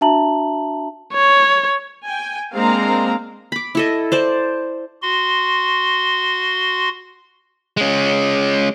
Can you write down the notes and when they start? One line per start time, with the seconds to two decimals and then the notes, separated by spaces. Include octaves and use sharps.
0.01 D4 F#4 E5 A5 A#5 F#7
1.13 C#5
2.05 G5 G#5
2.53 G#3 A#3 C4 D4 F5 A#5
3.52 B5 D6
3.75 E4 A4 D#5
4.12 C5 D5 A5
5.02 F#4 C6
7.77 G#3 C#4